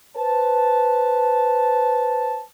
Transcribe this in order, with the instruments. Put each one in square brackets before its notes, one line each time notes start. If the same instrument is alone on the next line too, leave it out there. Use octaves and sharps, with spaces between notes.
[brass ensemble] B4 C5 A5